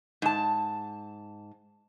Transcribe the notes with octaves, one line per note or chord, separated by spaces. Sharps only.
G#2 A5